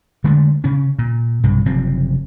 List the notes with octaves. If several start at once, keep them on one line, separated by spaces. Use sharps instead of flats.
D3 G#3 A3
C#3 C#4
A#2
B1 G2 C3
F#1 C3 F3 C4